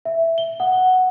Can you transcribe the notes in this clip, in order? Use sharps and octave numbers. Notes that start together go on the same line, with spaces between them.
E5
G7
F#5